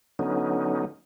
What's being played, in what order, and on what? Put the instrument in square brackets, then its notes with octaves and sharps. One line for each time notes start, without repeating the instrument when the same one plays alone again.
[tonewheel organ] D3 F#3 B3 C#4 D#4